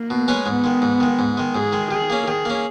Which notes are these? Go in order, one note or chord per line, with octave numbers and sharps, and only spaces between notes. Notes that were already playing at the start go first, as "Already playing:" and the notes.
Already playing: A#3
B2
G#3 C#4 G#4 B4
G#2 B3
D#3 G#3
G#2
D#3 G#3
G#2
D#3 G#3
G#2 G#4
D#3 G#3
D#3 G#4
A#3 C#4
D#3 G#4
A#3 C#4